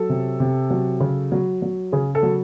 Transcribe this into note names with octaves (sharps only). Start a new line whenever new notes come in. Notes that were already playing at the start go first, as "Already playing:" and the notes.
Already playing: F#3 A4
C3
C3
F#3
C#3
F#3
F#3
C#3 G#4
A4
F#3